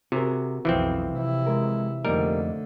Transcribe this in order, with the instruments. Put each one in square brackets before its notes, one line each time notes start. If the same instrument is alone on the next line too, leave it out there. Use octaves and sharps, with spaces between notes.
[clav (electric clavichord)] C3 [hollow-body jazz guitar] F#4 G#4 A#4
[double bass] B1 F2 [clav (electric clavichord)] E3 F3 C4
[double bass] C3 E4
[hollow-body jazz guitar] G#3 A#4
[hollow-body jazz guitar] F2 A#3 D#4 [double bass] D3 A3 [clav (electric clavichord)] G3 A#4